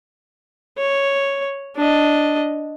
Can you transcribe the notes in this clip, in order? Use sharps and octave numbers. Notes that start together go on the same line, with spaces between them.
C#5
D4 D#5